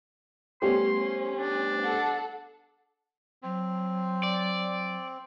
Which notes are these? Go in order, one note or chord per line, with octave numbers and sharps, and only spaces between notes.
G3 A3 B3 C#4 G4 C5 C6
C#4
D4
A4 F#5
F#3 C4
D5